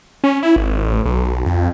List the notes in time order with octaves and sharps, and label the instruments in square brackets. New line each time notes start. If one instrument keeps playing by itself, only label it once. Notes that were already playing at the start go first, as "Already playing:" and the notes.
[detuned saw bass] C#4
E4
G#1
A1
B1
F2